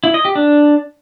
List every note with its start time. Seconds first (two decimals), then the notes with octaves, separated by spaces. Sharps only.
0.04 E4
0.14 D#5
0.25 G4
0.35 D4